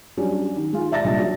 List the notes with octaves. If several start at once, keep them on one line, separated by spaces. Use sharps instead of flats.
F#3 G3 C#4 D4
D#3
G#3 F4
D5 E5 A5 A6 A#6
C2 A#2 D4 D5 D#5
F#3